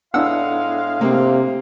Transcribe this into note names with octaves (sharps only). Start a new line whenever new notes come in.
A2 G#3 B3 D4 E4 F5 F#5 E6
C3 A#3 C4